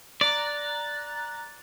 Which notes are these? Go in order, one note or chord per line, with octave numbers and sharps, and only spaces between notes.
D5 A#5 F#6 A6